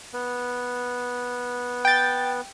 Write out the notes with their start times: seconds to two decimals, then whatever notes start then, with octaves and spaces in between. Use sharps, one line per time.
0.13 B3
1.85 G5 A6